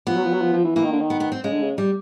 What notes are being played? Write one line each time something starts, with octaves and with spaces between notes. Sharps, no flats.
F3 B3
F#3
F3
F#3
F3
F3
E3
E3 A#3
D#3
D3
D#3
B3
B3
C4
C#3 G#3
D3
C#3
G3